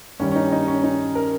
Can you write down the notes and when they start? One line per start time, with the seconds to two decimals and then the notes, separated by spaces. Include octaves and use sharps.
0.20 G2 D#3 G3 C#4
0.31 C#4
0.36 D#4
0.52 D#4
0.67 C#4
0.84 D#4
1.15 A#4